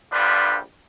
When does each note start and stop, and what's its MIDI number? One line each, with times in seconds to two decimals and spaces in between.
0.12 0.58 34
0.12 0.58 50
0.12 0.58 53
0.12 0.58 55
0.12 0.58 62
0.12 0.58 71